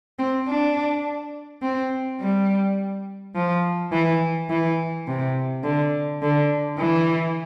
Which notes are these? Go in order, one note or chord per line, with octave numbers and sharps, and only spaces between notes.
C4
D4
C4
G3
F3
E3
E3
C3
D3
D3
E3